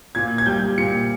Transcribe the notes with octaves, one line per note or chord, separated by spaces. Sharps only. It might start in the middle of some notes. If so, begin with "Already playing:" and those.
A#2 G#6
G#6
G3 G6
A#2 C#7